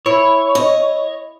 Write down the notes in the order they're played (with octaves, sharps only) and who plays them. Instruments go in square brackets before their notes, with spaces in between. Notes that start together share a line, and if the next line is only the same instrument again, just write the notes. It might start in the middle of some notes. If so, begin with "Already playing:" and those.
[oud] E4 [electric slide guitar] C#5
[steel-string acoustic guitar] D#5